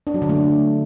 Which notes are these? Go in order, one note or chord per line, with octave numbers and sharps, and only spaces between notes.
D4
F#3
D3
A3